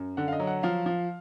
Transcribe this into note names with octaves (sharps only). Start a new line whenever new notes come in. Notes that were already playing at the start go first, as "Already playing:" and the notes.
Already playing: F#2
D3 F#5
F5
D#5
F#3
F#5
F3 F5
F3